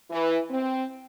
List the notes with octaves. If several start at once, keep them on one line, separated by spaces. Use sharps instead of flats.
E3
C4